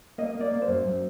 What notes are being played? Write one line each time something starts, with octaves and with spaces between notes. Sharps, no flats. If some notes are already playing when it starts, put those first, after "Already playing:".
A#3 D#5
A#3
D5
A#3
C5
F#2
F#2